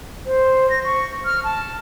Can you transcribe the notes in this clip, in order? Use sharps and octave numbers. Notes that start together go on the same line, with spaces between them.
C5
A#6
C#6
F6
A5